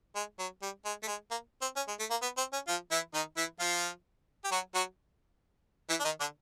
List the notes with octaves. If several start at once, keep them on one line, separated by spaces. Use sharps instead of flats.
G#3
F#3
G3
G#3
A3
G#3
A#3
C4
C#4
G#3
A3
A#3
B3
C4
C#4
F3 F4
E3 E4
D#3 D#4
E3 E4
F3 F4
G4
F#3 F#4
F#3 F#4
E3 E4
D4
D#3 D#4
D3 D4